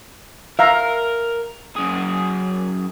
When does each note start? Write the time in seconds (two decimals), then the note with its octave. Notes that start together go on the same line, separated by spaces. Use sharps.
0.59 A#4 E5 F5 A#5
1.76 F#2 G#4